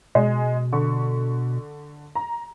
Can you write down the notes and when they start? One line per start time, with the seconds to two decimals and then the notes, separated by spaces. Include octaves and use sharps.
0.15 B2 G#3
0.73 D3 C#6
2.15 A#5